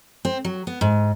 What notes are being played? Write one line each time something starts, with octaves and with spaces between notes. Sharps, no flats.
C4
F#3
B3
G#2